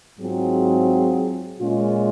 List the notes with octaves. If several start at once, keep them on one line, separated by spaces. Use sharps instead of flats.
G#2 F#3 C4 F4 G#4
A#2 G#3 C#4 F4